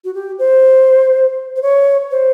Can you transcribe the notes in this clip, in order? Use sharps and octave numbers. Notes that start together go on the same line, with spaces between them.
F#4
G4
C5
C5
C#5
C5